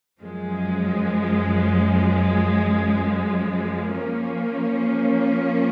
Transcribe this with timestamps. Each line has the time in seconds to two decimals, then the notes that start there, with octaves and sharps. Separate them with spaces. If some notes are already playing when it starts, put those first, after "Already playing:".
0.20 F#2 F3 G#3
3.96 F3 A#3 C#4